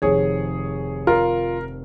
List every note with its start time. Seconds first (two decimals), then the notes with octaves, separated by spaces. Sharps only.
0.02 F1 F2 D#3 G#4 C#5
1.07 F4 A#4